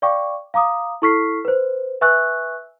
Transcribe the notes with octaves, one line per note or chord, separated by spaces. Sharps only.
D5 F5 G5 C#6 D6
F5 A#5 D6 D#6
E4 A4 C#6 F6 B6 C7
B4 C5
B4 E5 G#5 C#6 E6 F#6